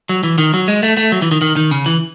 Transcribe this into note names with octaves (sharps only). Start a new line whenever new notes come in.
F#3
E3
D#3
F#3
G#3
A3
A3
F#3
E3
D#3
D#3
D#3
C#3
E3